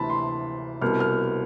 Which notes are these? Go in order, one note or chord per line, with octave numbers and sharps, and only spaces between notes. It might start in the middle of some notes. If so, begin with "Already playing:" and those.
Already playing: D2 C3 E3 A5 B5
C6
C2 B2 F6
F6